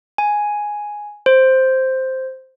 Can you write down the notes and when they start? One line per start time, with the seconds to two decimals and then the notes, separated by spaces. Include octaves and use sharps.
0.18 G#5
1.26 C5